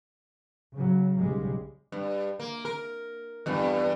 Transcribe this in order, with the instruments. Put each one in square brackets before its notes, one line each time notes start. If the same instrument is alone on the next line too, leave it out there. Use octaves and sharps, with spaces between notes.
[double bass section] C#3 F#3
B1 C#3 G3 G#3
[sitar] G2
A#3
A#4
E2 G2